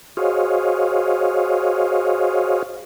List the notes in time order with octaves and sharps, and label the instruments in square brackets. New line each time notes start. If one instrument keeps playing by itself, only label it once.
[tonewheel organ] F#4 G#4 C5 C#5 D#5 F5